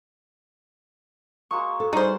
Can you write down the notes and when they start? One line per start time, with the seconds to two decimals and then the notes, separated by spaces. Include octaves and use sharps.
1.51 G#3 A#3 F#4 C#6
1.80 A4
1.93 G3 B3 C#4 D#4 F#4 G#4 C5 D5